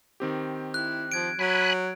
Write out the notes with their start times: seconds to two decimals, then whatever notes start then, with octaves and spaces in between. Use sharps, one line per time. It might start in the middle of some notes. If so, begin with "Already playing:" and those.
0.20 D#3 C4 G4
0.74 E4 F#6
1.12 F3 G#6 D7
1.39 F#3 G#5 B5 F#6